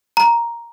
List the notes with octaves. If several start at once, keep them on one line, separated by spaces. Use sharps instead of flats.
A#5